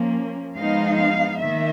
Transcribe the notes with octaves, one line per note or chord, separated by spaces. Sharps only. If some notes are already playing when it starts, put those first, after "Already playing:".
Already playing: F3 A#3 C#4
F3 G#3 B3 D#4 F5
F5
D#3 A#3 E5